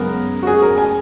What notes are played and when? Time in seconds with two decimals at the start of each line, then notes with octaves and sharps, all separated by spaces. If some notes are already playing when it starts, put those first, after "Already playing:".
Already playing: F#2 C#3 G#3 B3 A#4
0.43 F#4
0.47 G#4
0.62 A#4
0.78 G#5